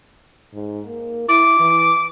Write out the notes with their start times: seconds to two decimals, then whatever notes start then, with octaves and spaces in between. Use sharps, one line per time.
0.54 G#2
0.87 A#3
1.29 E4 D6
1.60 E3